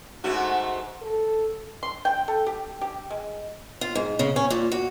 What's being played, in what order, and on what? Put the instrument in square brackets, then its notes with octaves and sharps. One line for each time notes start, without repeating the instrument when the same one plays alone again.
[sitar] G#2 A3 F#4
[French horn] A4
[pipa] C6
G5
A4
G4
G4
G#3
[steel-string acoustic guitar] F4
G#2
C#3
C#4
A#2
F#4